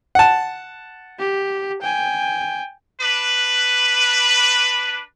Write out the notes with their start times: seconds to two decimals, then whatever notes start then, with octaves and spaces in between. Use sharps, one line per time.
0.15 F#5 A5
1.19 G4
1.82 G5 G#5
3.01 D4 B4